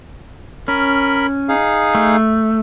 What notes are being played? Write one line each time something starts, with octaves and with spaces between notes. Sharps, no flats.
C#4 A#4 B5
D#4 G#4 F5
A3